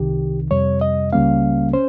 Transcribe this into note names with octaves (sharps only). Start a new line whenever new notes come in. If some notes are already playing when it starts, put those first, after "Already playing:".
Already playing: C2 C3 D#3 G4
F2 C3 G3 C#5
D#5
C#2 C#3 G3 A#3 C#4 F5
C#4 C5